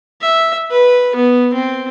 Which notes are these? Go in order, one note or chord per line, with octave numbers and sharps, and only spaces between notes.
E5
B4
B3
C4